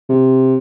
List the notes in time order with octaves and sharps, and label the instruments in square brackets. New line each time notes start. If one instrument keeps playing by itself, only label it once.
[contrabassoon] C3